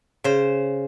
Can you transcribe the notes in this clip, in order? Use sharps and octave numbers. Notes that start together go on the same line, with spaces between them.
C#3 C5